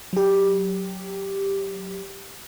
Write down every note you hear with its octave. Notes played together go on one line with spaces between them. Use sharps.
F#3 G4